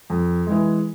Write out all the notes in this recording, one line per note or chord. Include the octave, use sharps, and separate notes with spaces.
F2
E3 G#3